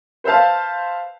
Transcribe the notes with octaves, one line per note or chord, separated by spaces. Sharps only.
B4 C5 E5 F5 A5